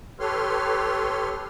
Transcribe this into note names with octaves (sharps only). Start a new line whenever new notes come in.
G4 A4 B4 C#5 C6 F6